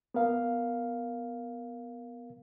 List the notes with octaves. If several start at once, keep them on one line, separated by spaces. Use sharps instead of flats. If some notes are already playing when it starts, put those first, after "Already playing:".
B3 A#4 F5